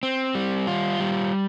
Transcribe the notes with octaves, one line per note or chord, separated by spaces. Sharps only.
C4
G3
F4
G3